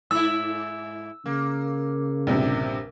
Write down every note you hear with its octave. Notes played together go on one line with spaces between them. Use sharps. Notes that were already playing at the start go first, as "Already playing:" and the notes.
G#2 E4 E6
C#3 A#3
A#1 G2 C3